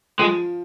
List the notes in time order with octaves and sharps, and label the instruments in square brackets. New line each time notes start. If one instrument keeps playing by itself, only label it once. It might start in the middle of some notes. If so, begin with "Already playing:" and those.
[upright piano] F3 [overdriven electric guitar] G#3